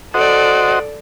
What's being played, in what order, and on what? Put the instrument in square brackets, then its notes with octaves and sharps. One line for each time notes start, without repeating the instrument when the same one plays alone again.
[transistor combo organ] F#4 C5 D#5 [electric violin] A4 D5